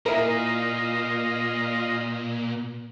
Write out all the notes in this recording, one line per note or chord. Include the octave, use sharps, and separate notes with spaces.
A#2 E4 F4 A#4 D#5